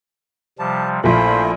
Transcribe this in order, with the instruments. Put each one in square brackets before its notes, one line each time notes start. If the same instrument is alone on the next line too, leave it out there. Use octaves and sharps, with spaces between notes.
[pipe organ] C3 F3 G3 [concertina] A5
[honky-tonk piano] A#1 A#2 [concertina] A3 E4 F4 [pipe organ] C5 B5